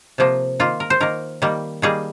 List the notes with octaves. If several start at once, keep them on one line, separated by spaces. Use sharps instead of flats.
C3 F3 A#3
D#3 A#3 F4
A#4
C5
D#3 A#3 A#4
D#3 G3 A#3
D#3 G3 A#3 G#4